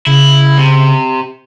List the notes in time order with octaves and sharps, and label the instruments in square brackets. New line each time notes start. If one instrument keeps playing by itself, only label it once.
[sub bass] C#3 [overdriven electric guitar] E4
[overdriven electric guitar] C3